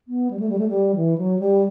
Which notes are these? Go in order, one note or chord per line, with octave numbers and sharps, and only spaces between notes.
B3
G3
A3
G3
A3
G3
E3
F#3
G3